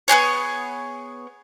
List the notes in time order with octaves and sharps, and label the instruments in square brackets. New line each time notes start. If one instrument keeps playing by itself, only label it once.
[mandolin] B3 D#4 G#4 C#5